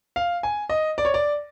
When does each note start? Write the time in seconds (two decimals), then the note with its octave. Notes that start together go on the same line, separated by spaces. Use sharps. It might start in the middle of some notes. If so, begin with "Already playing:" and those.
0.16 F5
0.43 G#5
0.69 D#5
0.98 D5
1.05 C#5
1.14 D5